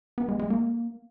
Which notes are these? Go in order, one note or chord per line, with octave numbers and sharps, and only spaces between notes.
B3
G#3
G#3
A#3